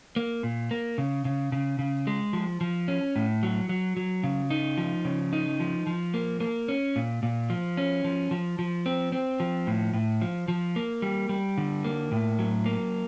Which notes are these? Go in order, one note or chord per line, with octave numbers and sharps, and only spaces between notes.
A#3
A#2
A#3
C#3
C#3
C#3
C#3
G#3
F3
F3
C#4
A2
F#3
F#3
F#3
C#3
D#4
F3
C#3
D#4
F3
F3
A#3
A#3
C#4
A#2
A#2
F3
C#4
F3
F3
F3
C4
C4
F3
A2
A2
F3
F3
A#3
G3
G3
D3
A#3
A2
F#3
A#3